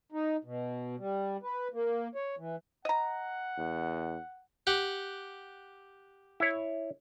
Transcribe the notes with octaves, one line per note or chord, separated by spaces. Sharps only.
D#4
B2
G3
B4
A#3
C#5
E3
D#5 F#5 A#5
E2
G4 F#5
E4 C#5